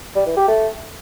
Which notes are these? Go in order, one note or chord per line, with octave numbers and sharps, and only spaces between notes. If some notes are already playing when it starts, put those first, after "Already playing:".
G3
E3
G4
A3